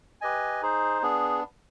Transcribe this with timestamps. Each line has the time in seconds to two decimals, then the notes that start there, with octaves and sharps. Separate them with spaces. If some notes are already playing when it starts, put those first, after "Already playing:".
0.21 G4 B4 D#5 G#5
0.62 D#4 G#4 C5
1.02 B3 D4 G#4